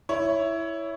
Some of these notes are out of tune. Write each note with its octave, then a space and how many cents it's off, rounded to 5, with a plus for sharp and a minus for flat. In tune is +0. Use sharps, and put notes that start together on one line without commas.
E4 +0 C#5 +15